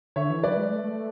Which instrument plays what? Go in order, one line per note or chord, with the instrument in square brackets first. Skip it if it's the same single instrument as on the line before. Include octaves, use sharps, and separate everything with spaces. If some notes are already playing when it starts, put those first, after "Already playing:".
[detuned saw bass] D3 [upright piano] C#5 E5
[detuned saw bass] E3
[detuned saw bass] F#3 [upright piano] B4 D5
[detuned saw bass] G#3
A3